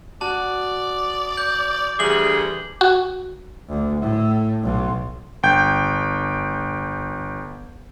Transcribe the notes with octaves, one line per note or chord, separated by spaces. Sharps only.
F#4 D5 A5
G6
D2 E3 G3 G#4 D6 F#7
F#4
D2
A2
B1
G1 G5 G6